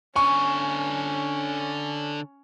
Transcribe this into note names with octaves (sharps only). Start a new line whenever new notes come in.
D3 C#4 G#5 C#6